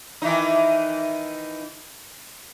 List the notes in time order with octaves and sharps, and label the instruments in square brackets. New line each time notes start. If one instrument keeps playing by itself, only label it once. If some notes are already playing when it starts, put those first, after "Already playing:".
[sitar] D#3 E3 D#4